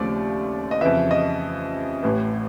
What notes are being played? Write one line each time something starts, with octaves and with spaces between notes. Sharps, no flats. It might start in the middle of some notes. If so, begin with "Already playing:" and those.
Already playing: D#2 C#3 F3 A3 C4 D5
D#5
F2 C#3 E3 E5
D#5
A1 A2 E3